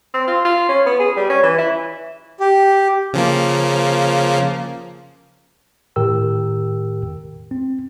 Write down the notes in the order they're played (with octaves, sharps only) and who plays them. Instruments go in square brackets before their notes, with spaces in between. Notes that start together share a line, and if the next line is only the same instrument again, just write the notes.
[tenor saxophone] C4
F4
F4
C#4
B3
G#4
G3
C#4
E3
E4
[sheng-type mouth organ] G4
[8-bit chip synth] C#3 F3 A#3
[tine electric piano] A2 D#3 G4 A#4 G5 E6
C4